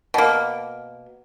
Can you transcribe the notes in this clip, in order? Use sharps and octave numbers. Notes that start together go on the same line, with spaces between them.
B2 A#3